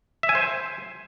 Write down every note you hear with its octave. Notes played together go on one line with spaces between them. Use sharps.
E5
G#5
C5